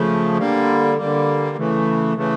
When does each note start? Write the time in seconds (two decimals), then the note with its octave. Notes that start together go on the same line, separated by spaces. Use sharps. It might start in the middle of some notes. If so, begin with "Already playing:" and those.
Already playing: C#3 F3 A3
0.38 D3 G3 A#3
0.98 D3 G3 A#3
1.57 C#3 E3 A3
2.16 C#3 E3 A3